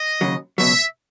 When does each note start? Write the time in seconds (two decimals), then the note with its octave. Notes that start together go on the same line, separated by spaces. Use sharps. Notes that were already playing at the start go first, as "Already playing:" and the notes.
Already playing: D#5
0.21 D#2 C#3 F#3
0.58 C#2 B2 F#3 E5